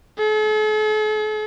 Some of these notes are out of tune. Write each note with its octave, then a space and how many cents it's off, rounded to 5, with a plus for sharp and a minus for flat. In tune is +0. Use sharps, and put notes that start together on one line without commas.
A4 -45